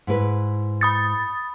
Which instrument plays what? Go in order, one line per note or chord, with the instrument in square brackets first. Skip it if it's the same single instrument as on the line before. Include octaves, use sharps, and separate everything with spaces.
[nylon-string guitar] G#2 E4 B4
[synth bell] B5 D#6 A6